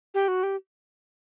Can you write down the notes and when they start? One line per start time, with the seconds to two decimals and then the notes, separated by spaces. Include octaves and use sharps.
0.14 G4
0.28 F#4
0.43 G4